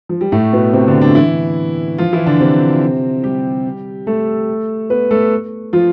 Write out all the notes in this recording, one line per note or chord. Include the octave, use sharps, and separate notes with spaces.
F3
G3
A2 A3
B2 B3
C3 C4
D3 D4
D3 D4
E3 E4
F3 F4
E3 E4
D3 D4
C3 C4
G3 G4
A3 A4
B3 B4
A3 A4
F3 F4